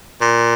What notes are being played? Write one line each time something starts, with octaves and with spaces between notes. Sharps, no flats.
A#2